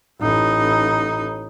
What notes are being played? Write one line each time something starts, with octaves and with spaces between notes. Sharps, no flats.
A1 D#4